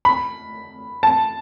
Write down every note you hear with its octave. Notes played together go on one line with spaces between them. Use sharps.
B5
A5